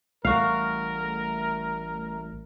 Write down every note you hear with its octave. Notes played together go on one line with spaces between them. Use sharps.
A1 G3 A3 F#4 A#4 F5
A3